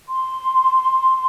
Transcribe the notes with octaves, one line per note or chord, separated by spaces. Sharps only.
C6